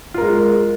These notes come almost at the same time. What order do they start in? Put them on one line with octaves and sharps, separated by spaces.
F4 A#4 G#3